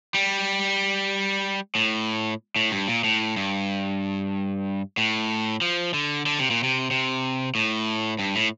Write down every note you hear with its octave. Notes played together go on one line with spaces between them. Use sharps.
G3
A2
A2
G2
A#2
A2
G2
A2
F3
D3
D3
C3
A#2
C3
C3
A2
G2
A2